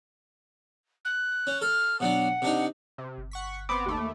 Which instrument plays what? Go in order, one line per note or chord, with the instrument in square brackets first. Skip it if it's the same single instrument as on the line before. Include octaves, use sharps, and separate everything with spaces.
[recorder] F#6
[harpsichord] C#4
[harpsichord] A4 [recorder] F6
[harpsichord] B2 F#3 D4 [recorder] F#5
[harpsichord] C3 D4 D#4
[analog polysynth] C3
[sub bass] G1
[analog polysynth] F#5 C#6 B6
[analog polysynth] B3 C4 [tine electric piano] B5 D6
[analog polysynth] D#2 A3